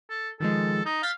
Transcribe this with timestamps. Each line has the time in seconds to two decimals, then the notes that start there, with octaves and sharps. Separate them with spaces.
0.10 A4
0.40 D#3 F3 G#3 A4
0.85 D#4
1.03 F5 G6 A6 B6